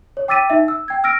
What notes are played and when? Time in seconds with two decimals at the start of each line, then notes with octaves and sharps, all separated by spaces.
0.17 C#5
0.28 G5 D6 E6 A6 B6 D#7
0.50 D#4 E5
0.68 E6
0.88 G5 G#6
1.04 E6 F6 A#6 D7